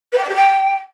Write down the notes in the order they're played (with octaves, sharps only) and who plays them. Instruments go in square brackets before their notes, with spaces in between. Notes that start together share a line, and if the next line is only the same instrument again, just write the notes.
[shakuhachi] B4
G5
D5
G4
G5